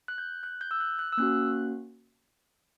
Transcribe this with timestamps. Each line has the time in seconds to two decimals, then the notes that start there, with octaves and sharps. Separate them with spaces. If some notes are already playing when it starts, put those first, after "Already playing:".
0.08 F#6
0.18 G6
0.43 F#6
0.61 G6
0.71 E6
0.80 F#6
0.99 F#6
1.12 E6
1.18 A#3 C#4 F#4 F#6